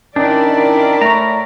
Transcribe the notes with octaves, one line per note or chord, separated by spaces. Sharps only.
D#3 C#4 D4 E4 A#4 D5
D#3
A2 A3 A#5 C#6